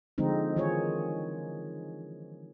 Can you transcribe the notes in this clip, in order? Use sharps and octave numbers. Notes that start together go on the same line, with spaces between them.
D3 F3 G#3 C4 D#4
D#3 E3 F4 G#4 C#5